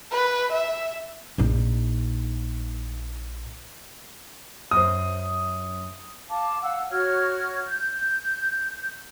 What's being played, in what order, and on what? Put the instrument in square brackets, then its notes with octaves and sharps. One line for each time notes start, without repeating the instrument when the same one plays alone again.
[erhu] B4
E5
[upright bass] A#1 D#4
[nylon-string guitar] F#2 C5 [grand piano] D#6
[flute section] F5 A5 D6
F5 F#5 E6
F#4 C#5 F6 G#6
G6